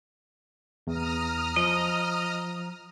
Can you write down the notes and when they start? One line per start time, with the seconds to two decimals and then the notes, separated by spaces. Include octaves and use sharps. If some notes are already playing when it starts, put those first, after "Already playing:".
0.87 E2 A#5 D#6 F6
1.56 F3 D#5